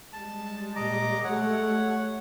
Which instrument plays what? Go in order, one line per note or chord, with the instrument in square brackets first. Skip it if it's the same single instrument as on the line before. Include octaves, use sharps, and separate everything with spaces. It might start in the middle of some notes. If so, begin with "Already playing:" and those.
[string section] G3 G#3 [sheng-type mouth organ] A5
[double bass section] A#2 [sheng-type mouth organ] D#5 A#5 D6
[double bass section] A3 [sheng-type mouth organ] C#5 F#5